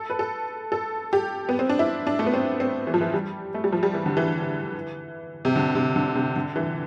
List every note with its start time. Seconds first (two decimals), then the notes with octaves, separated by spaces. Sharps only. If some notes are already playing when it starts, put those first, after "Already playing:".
Already playing: A4
0.10 B4
0.19 A4
0.72 A4
1.13 G4
1.49 B3
1.59 C4
1.69 D4
1.79 E4
2.07 D4
2.19 A3
2.26 B3
2.34 C4
2.60 C4
2.87 E3
2.94 F3
3.01 E3
3.14 G3
3.54 A3
3.64 G3
3.72 F3
3.83 G3
3.94 E3
4.06 D3
4.17 E3
5.45 C3
5.56 D3
5.75 C3
5.96 D3
6.16 C3
6.36 D3
6.56 E3